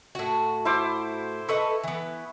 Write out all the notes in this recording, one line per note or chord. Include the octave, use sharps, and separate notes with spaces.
A2 F#4
E4 C5 D6
A4 B4 D#5 C#6
E3 B3